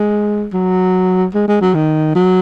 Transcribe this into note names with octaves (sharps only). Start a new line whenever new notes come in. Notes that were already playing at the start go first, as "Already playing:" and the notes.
Already playing: G#3
F#3
G#3
G#3
F#3
D#3
F#3